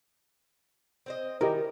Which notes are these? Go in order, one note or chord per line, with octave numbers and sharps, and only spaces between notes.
C4 C5 D#5
D#3 E4 G4 A#4 D#5